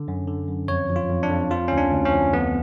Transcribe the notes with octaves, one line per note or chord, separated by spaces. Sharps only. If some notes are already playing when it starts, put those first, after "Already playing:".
Already playing: D3
F#2
D3
F#2
F2 C#5
F3
F4
F2
D4
F2
F3 F4
D2 C#4
D4
D2
C#4
F3
F2 B3